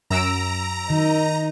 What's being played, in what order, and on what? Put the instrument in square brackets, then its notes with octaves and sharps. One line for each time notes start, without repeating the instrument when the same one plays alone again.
[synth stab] F#2 E6 D7 [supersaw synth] A#5
[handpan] D#3 [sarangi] D#4